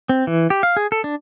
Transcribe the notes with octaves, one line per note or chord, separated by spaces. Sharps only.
C4
E3
G4
F5
G#4
A4
D4